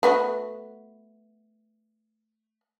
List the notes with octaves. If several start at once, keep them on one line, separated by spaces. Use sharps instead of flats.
A3 B3 F#4